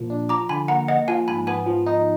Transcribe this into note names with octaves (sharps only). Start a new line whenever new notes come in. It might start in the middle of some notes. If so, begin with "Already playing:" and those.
Already playing: A#2 F3 A#3
D4
F3 A#5 D6
D3 G#5 B5
A#3 F#5 A#5
A#3 D#5 F#5
F3 F5 G#5
G#2 G#5 B5
B3 G#5 B5
F3
D#4